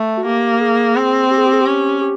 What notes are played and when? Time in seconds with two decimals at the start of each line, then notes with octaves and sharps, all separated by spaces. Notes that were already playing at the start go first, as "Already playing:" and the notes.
Already playing: A3
0.17 F#4
0.26 A#3 G4
0.61 G#4
0.97 C4
1.31 G4
1.38 G#4
1.46 G4
1.53 G#4
1.61 G4
1.66 C#4
2.01 G4